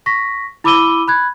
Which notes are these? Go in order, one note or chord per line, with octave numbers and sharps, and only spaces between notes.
C#6 A#6 B6
E4 B5 D6 E6 D#7 G7
B5 F#6 G#6